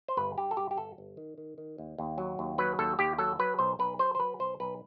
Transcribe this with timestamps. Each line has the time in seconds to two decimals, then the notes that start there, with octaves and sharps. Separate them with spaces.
0.08 C5
0.17 G1 B4
0.38 G2 G4
0.51 A4
0.57 G2 G4
0.71 G4
0.77 G1 A4
0.98 G1
1.17 D#3
1.38 D#3
1.58 D#3
1.78 D#2
1.98 D#2
2.18 F#3
2.39 D#2
2.58 F#3 B4
2.79 D#2 A4
2.99 D#2 G4
3.18 F#3 A4
3.39 F#3 B4
3.59 B1 C5
3.79 B1 B4
3.99 F#3 C5
4.15 C5
4.19 F#3 B4
4.39 B1 C5
4.60 B1 B4